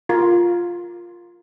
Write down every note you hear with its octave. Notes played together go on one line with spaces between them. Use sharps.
F4 A#4